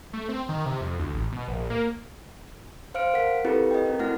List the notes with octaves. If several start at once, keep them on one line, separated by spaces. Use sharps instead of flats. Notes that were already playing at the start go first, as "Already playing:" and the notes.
A3
C4
D#3
C3
F2
D2
A1
B2
A#1
A#3
C5 F5 F6 D7
A#4 F#5 B6
C4 E4 F4 G4 A4 B4
D#5 G5
C4 A#4
A3 E4 F#4 F#5 F6 A#6